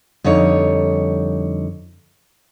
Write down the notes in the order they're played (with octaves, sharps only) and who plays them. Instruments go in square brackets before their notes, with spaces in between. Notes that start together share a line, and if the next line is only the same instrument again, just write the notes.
[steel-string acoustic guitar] F2 D3 G3 D#4 C#5